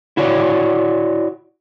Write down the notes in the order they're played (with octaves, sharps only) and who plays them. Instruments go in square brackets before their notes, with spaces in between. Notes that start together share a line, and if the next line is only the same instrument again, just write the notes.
[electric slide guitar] E4 F#4 C#5 D5